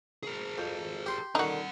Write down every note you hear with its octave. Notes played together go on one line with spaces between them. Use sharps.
G#4 A#4
F2
G4 C6
D3 D#3 D#4 F#4 A#4 F#5